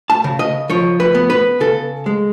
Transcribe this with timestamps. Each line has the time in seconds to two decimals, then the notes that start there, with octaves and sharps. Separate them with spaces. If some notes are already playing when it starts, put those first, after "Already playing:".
0.10 A5
0.24 C#3
0.39 D#5
0.70 F3 C#5
1.00 B4
1.15 B3
1.30 B4
1.60 C#3 A4
2.06 G#3